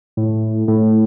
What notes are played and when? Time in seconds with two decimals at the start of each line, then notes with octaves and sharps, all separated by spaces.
0.17 A2
0.68 A2